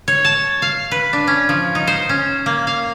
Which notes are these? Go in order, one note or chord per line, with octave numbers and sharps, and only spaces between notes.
C#5
A5
F5
B4
D4
C#4
F3
D#4
C5
C#4
A#3
F5